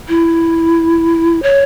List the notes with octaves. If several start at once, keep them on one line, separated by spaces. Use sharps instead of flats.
E4
C#5